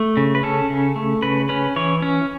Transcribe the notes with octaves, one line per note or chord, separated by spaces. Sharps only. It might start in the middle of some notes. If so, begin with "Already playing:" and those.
Already playing: A3
C#3
B4
C#4 A4
C#3
A3
C#3 B4
C#4 B4
E3 C#5
C#4